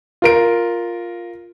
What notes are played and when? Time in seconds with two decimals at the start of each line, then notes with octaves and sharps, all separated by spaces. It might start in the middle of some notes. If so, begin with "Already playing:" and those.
0.22 F4 A#4 D7